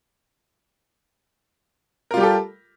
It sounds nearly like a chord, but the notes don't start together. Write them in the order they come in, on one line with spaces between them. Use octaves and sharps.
A#4 F4 G3 G4 A4